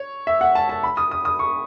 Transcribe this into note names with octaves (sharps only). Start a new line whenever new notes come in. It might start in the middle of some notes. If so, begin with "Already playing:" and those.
Already playing: C#5
E5
F#5
A5
A5
B5
D#6
D#6
D#6
C#6